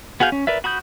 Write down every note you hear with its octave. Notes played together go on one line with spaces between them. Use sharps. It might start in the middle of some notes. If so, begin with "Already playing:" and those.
B3 F#4 G#4 F5 G6
C#4
A#4 B4 D5 E5
F#4 B5 D#6 G6